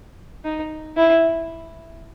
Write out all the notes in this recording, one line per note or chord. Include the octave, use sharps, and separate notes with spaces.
D#4
E4